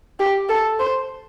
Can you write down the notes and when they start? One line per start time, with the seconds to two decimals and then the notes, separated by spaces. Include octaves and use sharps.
0.19 G4
0.49 A4
0.79 C5